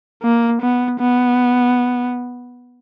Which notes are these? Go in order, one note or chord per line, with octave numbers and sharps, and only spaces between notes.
A#3
B3
B3